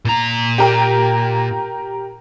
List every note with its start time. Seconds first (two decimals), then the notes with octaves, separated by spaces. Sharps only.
0.05 A#2 A#5
0.58 G4 A#4 G5